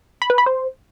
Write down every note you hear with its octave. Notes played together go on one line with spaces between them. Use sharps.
B5
B4
B5
C5